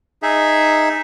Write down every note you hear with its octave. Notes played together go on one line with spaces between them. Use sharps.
D#4 G#4 E5